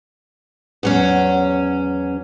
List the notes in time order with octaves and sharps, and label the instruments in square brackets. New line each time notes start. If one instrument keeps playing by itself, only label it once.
[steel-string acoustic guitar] E2 F#3 C#4